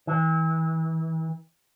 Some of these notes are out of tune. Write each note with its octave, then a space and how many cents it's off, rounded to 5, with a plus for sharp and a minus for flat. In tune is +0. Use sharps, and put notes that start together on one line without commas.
E3 -35